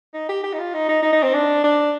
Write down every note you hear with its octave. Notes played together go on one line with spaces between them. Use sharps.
D#4
G4
G4
D#4
F4
D#4
D#4
D#4
D#4
C4
D4
D4